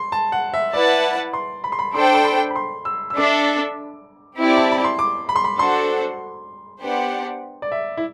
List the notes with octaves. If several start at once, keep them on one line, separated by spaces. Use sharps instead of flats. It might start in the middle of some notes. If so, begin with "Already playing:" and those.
Already playing: C6
A5
F#5
E5
E4 B4 D5 F#5 A5
C6
B5
C6
B5
D4 A4 C5 G5 C6
C6
B5
B5
C6
E6
E6
D4 A4 E5 D6
C4 E4 G4 D5
A5
B5
C6
D6
B5
C6
B5
D4 F#4 A4 C5 F#5 C6
B3 D4 G4 C5 F#5
D5
E5
E4